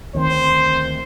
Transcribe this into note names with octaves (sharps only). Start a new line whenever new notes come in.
D2 D#3 C4 C5